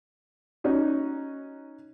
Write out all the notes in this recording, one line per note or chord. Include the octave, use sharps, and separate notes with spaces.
C#4 D#4 F#4